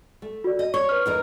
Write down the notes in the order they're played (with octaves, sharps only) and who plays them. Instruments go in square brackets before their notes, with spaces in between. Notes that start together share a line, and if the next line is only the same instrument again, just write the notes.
[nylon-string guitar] A3
[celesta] F#4 D5
[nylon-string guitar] D#5
[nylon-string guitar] C#5 [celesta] C#6
[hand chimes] B4 F6
[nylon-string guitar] E2 D#4 A#4